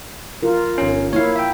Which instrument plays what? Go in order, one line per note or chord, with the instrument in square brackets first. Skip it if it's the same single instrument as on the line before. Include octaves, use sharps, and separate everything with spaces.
[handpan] F4 A#4
[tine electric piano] G1 C#4
[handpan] A#3 E4 [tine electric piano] C#5 F5
[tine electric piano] E5 G5